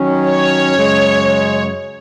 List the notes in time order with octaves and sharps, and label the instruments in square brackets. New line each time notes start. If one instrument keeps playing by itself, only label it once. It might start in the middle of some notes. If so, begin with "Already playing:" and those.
Already playing: [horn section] D#3 F#3 C#4
[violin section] C#5
[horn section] F#2 C#3 G#3